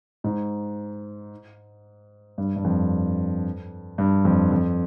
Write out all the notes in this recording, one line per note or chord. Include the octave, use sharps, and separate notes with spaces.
G#2
G2
G2
F2
G2
F2
F2